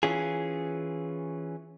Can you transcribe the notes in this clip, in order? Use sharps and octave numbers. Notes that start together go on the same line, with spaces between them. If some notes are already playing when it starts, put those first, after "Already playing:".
E3 C#4 F4 G#4